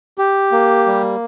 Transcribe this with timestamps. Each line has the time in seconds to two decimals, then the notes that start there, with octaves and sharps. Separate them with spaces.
0.18 G4
0.52 A#3
0.87 G3